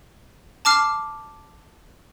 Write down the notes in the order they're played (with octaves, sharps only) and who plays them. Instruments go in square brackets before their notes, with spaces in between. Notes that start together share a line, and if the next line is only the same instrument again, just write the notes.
[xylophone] A5 D6 F6 C7